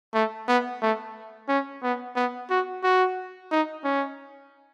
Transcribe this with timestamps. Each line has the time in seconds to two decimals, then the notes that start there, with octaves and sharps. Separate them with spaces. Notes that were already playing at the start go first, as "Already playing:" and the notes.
0.14 A3
0.48 B3
0.82 A3
1.49 C#4
1.83 B3
2.16 B3
2.50 F#4
2.84 F#4
3.52 D#4
3.85 C#4